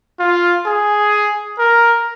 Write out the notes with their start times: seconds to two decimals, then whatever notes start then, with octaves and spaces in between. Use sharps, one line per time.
0.19 F4
0.66 G#4
1.59 A#4